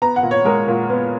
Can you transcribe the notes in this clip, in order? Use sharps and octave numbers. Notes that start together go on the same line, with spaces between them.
B3 A#5
F#5
A#2
C#5
G#3 A#4
A#2
B3